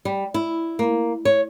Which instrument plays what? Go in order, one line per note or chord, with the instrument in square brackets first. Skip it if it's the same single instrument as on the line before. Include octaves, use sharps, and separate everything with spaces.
[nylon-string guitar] G3
E4
A#3
C#5